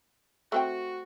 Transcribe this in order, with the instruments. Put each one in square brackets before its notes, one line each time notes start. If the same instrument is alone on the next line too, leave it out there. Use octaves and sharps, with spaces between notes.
[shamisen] A3 C4 G5 [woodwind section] F#4